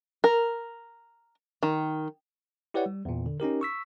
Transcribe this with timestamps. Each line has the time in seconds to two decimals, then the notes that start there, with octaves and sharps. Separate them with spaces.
0.24 A#4
1.63 D#3
2.74 E4 G4 B4 C#5 D5 F#5
2.86 G3
3.05 E2 A#2
3.26 D3
3.40 C#4 D#4 G4 A#4
3.61 C#6 E6 B6